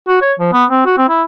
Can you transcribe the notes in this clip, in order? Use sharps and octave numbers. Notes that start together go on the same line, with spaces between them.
F#4
C#5
F3
B3
C4
F#4
C4
E4